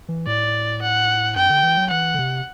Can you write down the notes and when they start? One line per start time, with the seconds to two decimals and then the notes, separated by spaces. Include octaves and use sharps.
0.09 E3
0.27 A2 D5
0.82 F#5
1.36 F#2 G5
1.50 D3
1.63 E3
1.77 F#3
1.91 E3 F#5
2.14 D3
2.19 C3